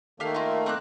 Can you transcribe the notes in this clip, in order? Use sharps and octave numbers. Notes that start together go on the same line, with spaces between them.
D#3 A3 A#3 G4 F5
F4 A#4
C4 D6 F#6